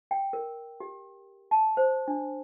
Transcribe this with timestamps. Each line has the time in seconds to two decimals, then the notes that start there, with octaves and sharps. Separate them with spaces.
0.11 G5
0.33 A#4
0.80 G4
1.51 A5
1.77 C5
2.08 D4